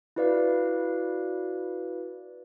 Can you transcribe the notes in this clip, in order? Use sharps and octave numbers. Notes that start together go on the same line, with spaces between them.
E4 F#4 B4 D5 F5